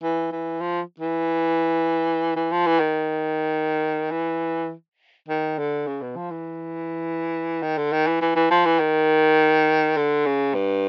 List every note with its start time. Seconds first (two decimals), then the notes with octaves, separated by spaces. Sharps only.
0.03 E3
0.32 E3
0.61 F3
1.00 E3
2.36 E3
2.52 F3
2.66 E3
2.80 D#3
4.11 E3
5.28 D#3
5.59 D3
5.87 C#3
6.02 B2
6.17 F3
6.31 E3
7.63 D#3
7.78 D3
7.92 D#3
8.07 E3
8.21 E3
8.36 E3
8.51 F3
8.66 E3
8.80 D#3
9.97 D3
10.26 C#3
10.54 G2